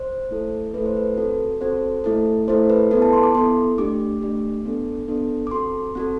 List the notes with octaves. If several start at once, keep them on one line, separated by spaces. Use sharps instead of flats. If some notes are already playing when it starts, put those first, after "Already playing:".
Already playing: C5
A3 E4 A4
A3 E4 A4 B4
C5
B4
C4 F#4 A4
C4 F#4 A4 C5
A3 E4 A4
A3 E4 A4 C5
B4
B3 E4 A4 B4
A5
C6
D6
B3 E4 A4 C6
A3 D4 G4 D6
A3 D4 G4
B3 D4 A4
B3 D4 A4
D6
C4 F#4 A4 C6
C4 F#4 A4